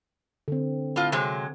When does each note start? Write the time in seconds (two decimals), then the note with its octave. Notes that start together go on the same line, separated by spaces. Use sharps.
0.48 D3 C4
0.96 A2 F4
1.12 C3 F#3 G#3